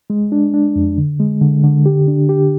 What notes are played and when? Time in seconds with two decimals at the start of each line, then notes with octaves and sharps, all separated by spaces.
0.10 G#3
0.32 D4
0.54 D4
0.76 F2
0.98 D3
1.20 G#3
1.41 D3
1.64 D3
1.86 G4
2.08 D4
2.29 G4